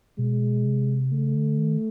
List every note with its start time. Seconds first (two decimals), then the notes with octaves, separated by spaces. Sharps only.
0.18 B2 G#3
0.65 C3
1.12 C#3 A3
1.35 D3
1.58 D#3